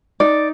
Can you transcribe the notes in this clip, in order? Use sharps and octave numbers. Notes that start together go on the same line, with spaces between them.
D#4 D5